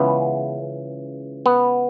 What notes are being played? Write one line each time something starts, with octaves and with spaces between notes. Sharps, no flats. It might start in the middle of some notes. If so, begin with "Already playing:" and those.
Already playing: C#2 C#3 E3 B3
B3